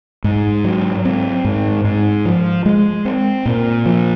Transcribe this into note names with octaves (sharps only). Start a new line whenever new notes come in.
G#2
F#3
C4
G#2
G#2
F3
G#3
C4
A#2
F3